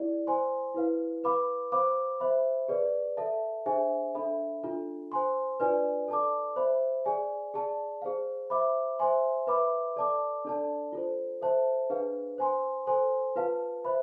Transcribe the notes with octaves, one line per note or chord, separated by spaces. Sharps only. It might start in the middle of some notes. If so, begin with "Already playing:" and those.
Already playing: E4 G#4 D5
C5 G#5 C6
E4 B4 F5
B4 F5 B5 D6
C5 F5 B5 D6
C5 E5 B5
G#4 B4 D5
A4 E5 A5
D4 G#4 C5 E5 G#5
D4 A4 E5 B5
D4 F4 A4
C5 G#5 C6
D4 F4 B4 D5 G#5
A4 D5 A5 D6
C5 E5 B5
G#4 D5 G#5
G#4 D5 A5
G#4 C5 F5
C5 E5 B5 D6
C5 E5 G#5 C6
B4 E5 B5 D6
A4 D5 A5 D6
D4 A4 D5 A5
F4 A4 C5
A4 C5 E5 A5
D4 G#4 B4 F5
C5 G#5 C6
A4 C5 G#5 C6
F4 B4 F5 A5
C5 E5 B5